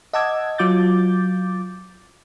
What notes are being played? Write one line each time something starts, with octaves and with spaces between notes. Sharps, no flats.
D#5 F#5 A5 D6 E6 G#6
F#3 F4 D6 G6 A6